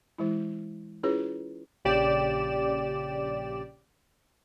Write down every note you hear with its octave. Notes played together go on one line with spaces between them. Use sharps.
E3 G#3 E4
C#4 E4 F4 G#4 B4 C#5
A#1 C#3 G4 D5 E7